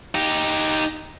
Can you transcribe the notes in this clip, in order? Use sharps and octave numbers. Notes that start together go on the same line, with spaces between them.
D#4 G4